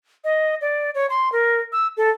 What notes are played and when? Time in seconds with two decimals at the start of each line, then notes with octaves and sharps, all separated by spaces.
0.24 D#5
0.61 D5
0.95 C#5
1.10 C6
1.32 A#4
1.72 E6
1.97 A4